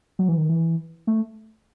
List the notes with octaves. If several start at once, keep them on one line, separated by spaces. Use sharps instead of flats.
F#3
E3
D#3
E3
A3